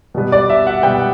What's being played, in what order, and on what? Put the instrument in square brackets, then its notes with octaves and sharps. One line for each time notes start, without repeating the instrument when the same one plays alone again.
[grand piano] B2 G3 B3
D5
E5
F#5
B2 G3 B3 G5